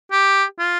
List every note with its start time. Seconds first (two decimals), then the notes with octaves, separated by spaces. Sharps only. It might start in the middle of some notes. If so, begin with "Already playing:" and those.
0.12 G4
0.59 F4